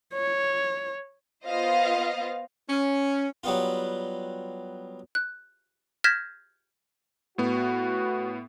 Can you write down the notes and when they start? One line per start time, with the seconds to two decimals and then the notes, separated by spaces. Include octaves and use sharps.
0.14 C#5
1.45 B3 F4 C5 D#5 F5
2.69 C#4
3.44 F#3 G3 B3 F4
5.15 F#6
6.04 F6 G6 G#6 A#6 B6 E7
7.38 A2 B3 F#4